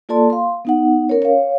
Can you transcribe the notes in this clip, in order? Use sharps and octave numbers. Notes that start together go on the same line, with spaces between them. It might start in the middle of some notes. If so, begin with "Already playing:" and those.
A#3 F4 A4 D5 A5 C6
F5 C6
B3 D#4 F#5
C#4 A#4 C#5
C#5 F5